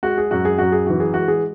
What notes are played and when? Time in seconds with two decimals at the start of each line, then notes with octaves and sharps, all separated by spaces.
0.03 G#3 F#4
0.18 G#4
0.31 F#2 F#4
0.45 G#4
0.58 F#2 F#4
0.72 G#4
0.87 E3 F#4
1.00 G#4
1.14 G#3 F#4
1.28 G#4